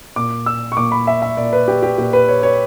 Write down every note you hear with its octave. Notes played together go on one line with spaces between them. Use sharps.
A#2 D6
E6
C#6
A#2 D6
B5
E5
E5
A#2 D5
B4
G4
G4
A#2 G4
B4
C#5
C#5